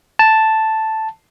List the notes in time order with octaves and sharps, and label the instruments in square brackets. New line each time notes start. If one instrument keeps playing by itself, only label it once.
[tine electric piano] A5